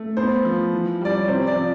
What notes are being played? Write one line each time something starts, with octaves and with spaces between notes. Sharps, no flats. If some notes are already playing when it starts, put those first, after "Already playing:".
Already playing: A3
B3 C5
F3
E3
G3 D5
C#5
C3 C5
D5
F3